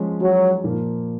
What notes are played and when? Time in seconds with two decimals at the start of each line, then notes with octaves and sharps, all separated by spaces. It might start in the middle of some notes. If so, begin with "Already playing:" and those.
Already playing: F3 G#3 C#4
0.21 F#3
0.64 A#2 F3 A#3